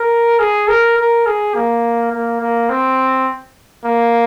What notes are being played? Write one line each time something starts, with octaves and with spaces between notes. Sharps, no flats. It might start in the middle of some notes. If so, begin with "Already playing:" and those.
Already playing: A#4
G#4
A#4
A#4
G#4
A#3
A#3
A#3
C4
A#3